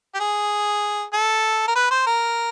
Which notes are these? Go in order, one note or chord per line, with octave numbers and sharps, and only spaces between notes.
G4
G#4
A4
A#4
B4
C5
A#4